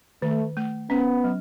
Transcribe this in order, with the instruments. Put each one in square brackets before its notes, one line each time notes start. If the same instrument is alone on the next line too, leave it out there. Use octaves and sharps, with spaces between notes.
[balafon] D#3 [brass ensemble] A3
[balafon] A3
[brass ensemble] B3 [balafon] C#4
[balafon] F#3